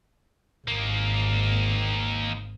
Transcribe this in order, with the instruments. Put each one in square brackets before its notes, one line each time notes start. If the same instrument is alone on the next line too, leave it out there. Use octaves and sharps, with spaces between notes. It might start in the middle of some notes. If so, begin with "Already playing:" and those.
[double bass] G#1 [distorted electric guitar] D#3 A#3